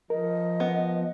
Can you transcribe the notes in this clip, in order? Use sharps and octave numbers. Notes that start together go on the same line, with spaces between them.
F3 A#4 D#5
B3